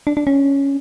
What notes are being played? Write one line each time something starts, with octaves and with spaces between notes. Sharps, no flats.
D4
D4
C#4